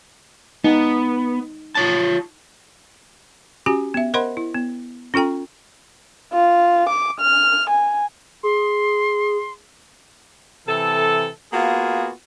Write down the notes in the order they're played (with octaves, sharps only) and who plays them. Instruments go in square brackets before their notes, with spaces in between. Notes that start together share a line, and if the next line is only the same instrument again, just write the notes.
[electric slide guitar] B3 [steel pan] D#4
[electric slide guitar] F4 C#5 A5
[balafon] C#4 F#4 G4 G#5
B3 E5
A#4 C5 D#5 F#5 B5 C6
E4
B3
C#4 F4 A4 G5 A#5
[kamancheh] F4
D6
F6
G#5
[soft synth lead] G#4 [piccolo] C6
[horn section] C3 E3 A4
A#3 B3 F4 F#4 G#4